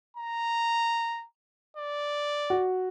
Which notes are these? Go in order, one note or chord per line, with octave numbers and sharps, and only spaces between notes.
A#5
D5
F#4